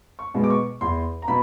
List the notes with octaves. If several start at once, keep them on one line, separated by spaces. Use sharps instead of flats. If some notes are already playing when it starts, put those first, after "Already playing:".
C#6
B2 G#3 B3
D6
C#6
E2 C6
A#5
B2 B5